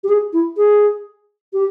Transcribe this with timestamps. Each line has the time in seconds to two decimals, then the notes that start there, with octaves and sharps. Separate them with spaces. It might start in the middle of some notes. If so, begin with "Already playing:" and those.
0.04 G4
0.09 G#4
0.33 E4
0.57 G#4
1.53 G4